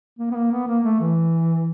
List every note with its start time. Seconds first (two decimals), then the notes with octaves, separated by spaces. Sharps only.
0.19 A#3
0.31 B3
0.35 A#3
0.51 B3
0.68 A#3
0.84 A3
1.00 E3